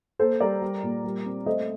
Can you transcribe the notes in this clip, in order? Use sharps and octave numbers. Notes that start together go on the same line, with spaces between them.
A#3 A4 C5
G3 A#4 D5
G3
A#2
G3
C4
A3 C5 D#5